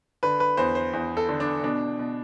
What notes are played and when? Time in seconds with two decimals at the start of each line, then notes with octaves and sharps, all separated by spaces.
0.23 D3 B4
0.40 B4
0.57 E2 C5
0.75 C5
0.93 E2
1.17 A4
1.29 D3
1.40 D4
1.63 B2 D4
1.99 B2